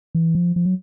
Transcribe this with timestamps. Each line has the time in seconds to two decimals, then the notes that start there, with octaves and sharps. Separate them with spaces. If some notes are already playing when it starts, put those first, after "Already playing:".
0.15 E3
0.35 F3
0.56 F3
0.65 F#3